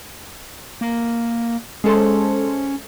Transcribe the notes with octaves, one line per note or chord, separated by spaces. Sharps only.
A#3
G#3 C#4 A4 C5